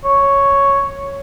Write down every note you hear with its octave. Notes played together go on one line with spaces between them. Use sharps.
C#5